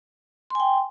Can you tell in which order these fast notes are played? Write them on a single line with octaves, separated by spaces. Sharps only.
C6 G#5 G5